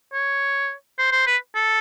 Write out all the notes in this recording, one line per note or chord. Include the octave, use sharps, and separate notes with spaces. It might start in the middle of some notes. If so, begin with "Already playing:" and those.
C#5
C5
C5
B4
A4